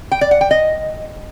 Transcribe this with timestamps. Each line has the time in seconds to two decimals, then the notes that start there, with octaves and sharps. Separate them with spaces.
0.12 G5
0.21 D5
0.31 F#5
0.41 G5
0.51 D#5